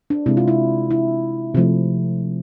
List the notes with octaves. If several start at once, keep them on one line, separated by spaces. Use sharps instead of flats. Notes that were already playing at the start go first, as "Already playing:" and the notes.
D4
C3 G#3 E4
F4
E4
E4
C3 F3 A3